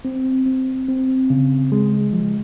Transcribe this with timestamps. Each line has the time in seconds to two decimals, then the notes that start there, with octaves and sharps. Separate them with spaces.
0.05 C4
0.46 C4
0.88 C4
1.30 C#3
1.72 G#3
2.13 F3